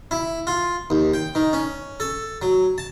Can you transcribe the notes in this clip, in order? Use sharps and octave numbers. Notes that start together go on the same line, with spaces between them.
E4
F4
D#2
G5
D#3
C#4
A4
F#3
A5